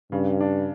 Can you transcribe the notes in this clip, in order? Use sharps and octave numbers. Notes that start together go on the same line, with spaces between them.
G2 C#3
D4